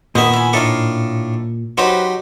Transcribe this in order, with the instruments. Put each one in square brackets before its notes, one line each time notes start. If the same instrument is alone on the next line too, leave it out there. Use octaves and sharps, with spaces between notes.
[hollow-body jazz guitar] A#2 [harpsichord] D#3 B3 E5 [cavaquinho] D#5
[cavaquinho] E4 G#5
[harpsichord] A2 D4 A4 [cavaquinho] D#4 F5
[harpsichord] F#3 D#4 G4 [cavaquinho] B4 C5